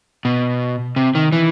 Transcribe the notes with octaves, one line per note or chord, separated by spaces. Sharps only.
B2
C3
D#3
E3